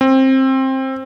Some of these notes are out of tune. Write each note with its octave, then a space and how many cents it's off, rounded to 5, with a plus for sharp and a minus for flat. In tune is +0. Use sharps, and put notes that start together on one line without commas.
C4 +20